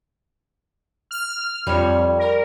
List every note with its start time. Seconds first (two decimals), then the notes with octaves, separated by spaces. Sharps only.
1.11 F6
1.67 F2 G3 C#5
2.18 A#4